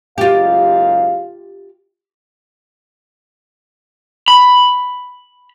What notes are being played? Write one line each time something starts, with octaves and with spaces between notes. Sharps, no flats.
F#1 G#2 F4 G4 F5
B5